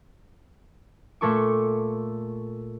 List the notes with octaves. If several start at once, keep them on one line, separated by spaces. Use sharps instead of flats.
A#2 A3 A4 C#6 D6